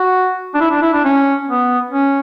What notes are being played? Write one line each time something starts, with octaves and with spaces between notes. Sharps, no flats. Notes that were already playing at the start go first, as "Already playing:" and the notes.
Already playing: F#4
D4
E4
D4
E4
D4
C#4
B3
C#4